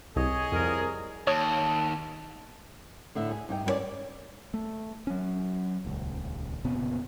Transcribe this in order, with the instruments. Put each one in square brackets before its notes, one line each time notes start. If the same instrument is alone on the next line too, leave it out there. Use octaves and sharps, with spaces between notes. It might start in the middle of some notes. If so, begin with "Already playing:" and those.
[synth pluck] C2 [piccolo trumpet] G#4 [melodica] C#5 D#5
[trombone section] C2 A#4 [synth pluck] F2
[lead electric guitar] D#2 [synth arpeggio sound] C#5 D#6 [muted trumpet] A5
[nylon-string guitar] A2 D3 E5
G#4
G2 D#4 G5
G2 B3 C#4 C#5 D5
[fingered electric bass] A3
F#3 C#4
D#1 C#2
F1 A#2 C#3 B3